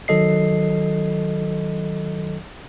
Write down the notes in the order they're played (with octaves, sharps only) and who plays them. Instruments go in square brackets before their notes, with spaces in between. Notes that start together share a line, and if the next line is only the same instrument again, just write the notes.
[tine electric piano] D#3 F#3 A4 D#5 C7